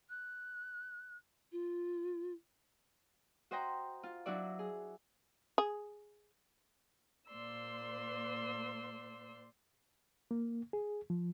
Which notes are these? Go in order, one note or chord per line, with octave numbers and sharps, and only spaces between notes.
F#6
F4
F#4 C5 D#5 G5 A#5
F4
F#3 D4 E4 F#4 D5
G#4
G#4
A#2 A#3 C5 D5 C6 E6
A#3
G#4
F3